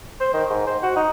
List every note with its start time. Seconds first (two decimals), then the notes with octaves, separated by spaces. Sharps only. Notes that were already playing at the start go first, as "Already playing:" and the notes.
0.21 C5
0.33 D#3
0.50 G#2
0.67 C5
0.83 F#4
0.96 D#4